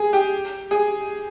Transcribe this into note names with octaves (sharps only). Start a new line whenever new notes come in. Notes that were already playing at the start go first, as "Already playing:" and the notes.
Already playing: G#4
G4
G#4